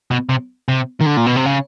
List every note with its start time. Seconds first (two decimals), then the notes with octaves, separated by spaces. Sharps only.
0.11 B2
0.29 C3
0.68 C3
1.01 D#3
1.06 D3
1.17 A#2
1.26 B2
1.36 C3
1.46 C#3